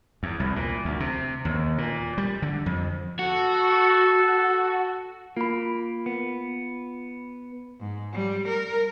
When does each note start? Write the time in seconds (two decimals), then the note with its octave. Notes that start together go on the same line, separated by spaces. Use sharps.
0.23 E2
0.40 C2
0.56 A#2
0.85 D2
1.00 C3
1.45 D#2
1.78 A#2
2.18 G3
2.42 D3
2.66 F2
3.19 F#4 A4
5.37 A#3 F4 B5
6.06 B3
7.80 G#2
8.13 G3
8.49 A#4